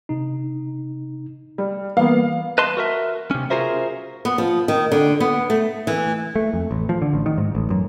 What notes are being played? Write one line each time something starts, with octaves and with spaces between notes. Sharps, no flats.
C3 D#4
G3
E3 G3 A#3 B3 B4 F5
B4 D#5 A5 C6
F#4 A#4 E5
C3 C#4
F4 F#4 G#4 A#4 C5 E5
B3
F3
D#3
D3
B3
A3
E3
A3
F2
A1
F3
D3
A1
D#3
G#2
A1
F#2